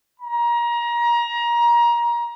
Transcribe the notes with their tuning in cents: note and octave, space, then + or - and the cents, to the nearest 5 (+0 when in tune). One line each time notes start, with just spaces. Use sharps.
A#5 +25